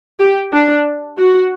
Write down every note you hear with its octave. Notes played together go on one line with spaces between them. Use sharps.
G4
D4
F#4